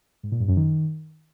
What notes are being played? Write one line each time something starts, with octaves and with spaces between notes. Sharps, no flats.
G#2
A#2
G2
F#2
D#3